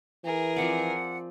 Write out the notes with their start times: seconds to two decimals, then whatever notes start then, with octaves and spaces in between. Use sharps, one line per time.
0.25 E3 G#4 A#4
0.56 F3 C4 D5 F#5